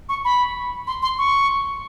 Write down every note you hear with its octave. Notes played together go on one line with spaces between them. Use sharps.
C#6
B5
C6
C6
C#6